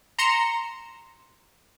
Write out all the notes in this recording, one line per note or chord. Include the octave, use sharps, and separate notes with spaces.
A#5 C6 C#7 E7